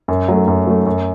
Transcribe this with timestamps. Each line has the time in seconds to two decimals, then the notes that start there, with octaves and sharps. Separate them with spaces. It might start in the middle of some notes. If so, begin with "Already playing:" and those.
0.08 F#2
0.28 F#3 A3
0.48 F#2
0.67 F#3 A3
0.86 F#2